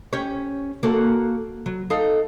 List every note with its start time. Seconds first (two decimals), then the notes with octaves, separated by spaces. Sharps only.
0.13 C#4 G4 C#5
0.83 A#3 F#4 A4
1.66 F#3
1.90 D#4 A4 F5